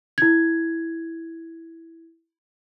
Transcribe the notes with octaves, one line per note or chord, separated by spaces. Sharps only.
E4 G#6